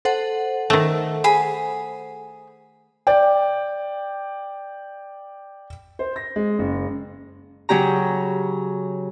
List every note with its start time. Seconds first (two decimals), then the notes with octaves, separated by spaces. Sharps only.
0.05 A4 C5 F#5
0.70 D#3 A3
1.24 G#4 B5
3.07 D5 G5
5.99 C5
6.16 A#6
6.36 G#3
6.59 F#1
7.69 C#3 F#3 C#4 G4 A#5